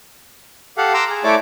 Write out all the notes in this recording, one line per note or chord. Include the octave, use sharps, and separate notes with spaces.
G4 A4 F5 F#5
A#5 C6 D6 E6
G#4
A3 E4 A4 C#5 D5 D6